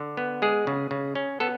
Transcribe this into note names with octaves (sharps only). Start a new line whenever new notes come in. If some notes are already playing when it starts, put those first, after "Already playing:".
Already playing: D3
B3
G#3 G#4
C#3
C#3
C#4
B3 A4